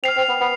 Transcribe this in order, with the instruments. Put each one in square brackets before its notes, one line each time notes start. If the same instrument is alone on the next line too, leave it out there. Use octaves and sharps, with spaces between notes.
[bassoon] C4 [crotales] F6 C7 F7
[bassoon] C4
B3
B3